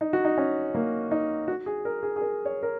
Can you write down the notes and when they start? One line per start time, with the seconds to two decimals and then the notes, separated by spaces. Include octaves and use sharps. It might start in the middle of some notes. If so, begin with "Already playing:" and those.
0.01 D#4
0.13 F#4
0.25 D#4
0.38 C#4
0.75 A#3
1.11 D#4
1.48 F#4
1.66 G#4
1.85 A#4
2.03 G#4
2.16 G#4
2.21 A#4
2.46 C#5
2.63 A#4